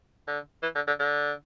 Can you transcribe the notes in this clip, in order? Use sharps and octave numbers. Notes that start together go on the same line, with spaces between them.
D3
E3
D3
D3
D3